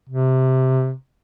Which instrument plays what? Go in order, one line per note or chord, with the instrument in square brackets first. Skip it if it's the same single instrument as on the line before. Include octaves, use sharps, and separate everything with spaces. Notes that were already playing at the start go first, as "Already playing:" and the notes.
[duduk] C3